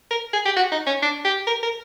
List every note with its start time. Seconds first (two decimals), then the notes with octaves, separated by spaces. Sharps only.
0.11 A#4
0.34 G#4
0.46 G4
0.57 F#4
0.72 D#4
0.87 C#4
1.02 D4
1.25 G4
1.47 A#4
1.63 A#4